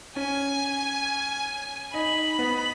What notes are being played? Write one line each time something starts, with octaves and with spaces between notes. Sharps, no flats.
C#4 G#5
D#4 B5
B3